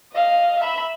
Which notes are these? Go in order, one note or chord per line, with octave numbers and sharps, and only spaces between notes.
D#5 F5
E5 B5